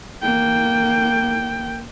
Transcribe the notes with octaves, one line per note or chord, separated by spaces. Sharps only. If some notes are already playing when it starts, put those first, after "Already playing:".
A#3 G5